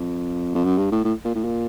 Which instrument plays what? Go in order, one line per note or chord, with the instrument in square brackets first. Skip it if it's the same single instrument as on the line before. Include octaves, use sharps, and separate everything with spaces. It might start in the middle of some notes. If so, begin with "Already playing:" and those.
Already playing: [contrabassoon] F2
F2
F#2
G2
A2
A2
A#2
A2
A#2